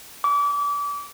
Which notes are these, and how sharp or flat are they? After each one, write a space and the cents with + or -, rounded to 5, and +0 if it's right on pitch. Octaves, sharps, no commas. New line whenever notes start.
D6 -30